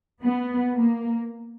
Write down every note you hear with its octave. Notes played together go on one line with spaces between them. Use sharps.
B3
A#3